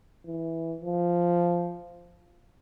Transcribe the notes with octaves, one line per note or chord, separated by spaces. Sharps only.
E3
F3